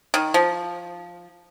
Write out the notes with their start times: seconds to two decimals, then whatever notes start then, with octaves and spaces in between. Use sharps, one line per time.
0.14 D#3
0.34 F3